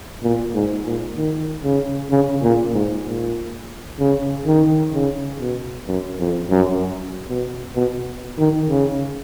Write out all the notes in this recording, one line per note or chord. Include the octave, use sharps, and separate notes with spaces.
A#2
G#2
A#2
D#3
C#3
C#3
A#2
G#2
A#2
C#3
D#3
C#3
B2
F#2
F2
F#2
B2
B2
D#3
C#3